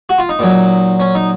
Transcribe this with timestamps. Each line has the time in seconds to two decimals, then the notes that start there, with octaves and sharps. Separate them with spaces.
0.09 F#4
0.19 F4
0.29 D#4
0.39 A#2 F#3
1.00 C#4
1.15 D#4